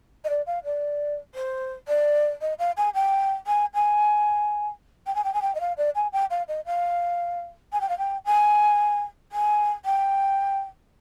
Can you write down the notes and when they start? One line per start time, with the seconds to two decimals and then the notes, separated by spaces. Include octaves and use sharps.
0.24 D#5
0.29 D5
0.46 F5
0.64 D5
1.34 C5
1.88 D5
2.41 D#5
2.59 F5
2.77 G#5
2.94 G5
3.47 G#5
3.74 G#5
5.06 G5
5.15 G#5
5.24 G5
5.33 G#5
5.41 G5
5.55 D#5
5.60 F5
5.77 D5
5.95 G#5
6.12 G5
6.30 F5
6.48 D#5
6.66 F5
7.72 G#5
7.80 G5
7.89 F5
7.98 G5
8.25 G#5
9.32 G#5
9.85 G5